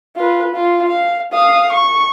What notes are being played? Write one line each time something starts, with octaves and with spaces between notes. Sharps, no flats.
F4 B4
F4
F5
F5 D#6
C#6